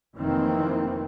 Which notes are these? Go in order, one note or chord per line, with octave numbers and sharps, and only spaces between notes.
F1 D#3 E3 A#3 C4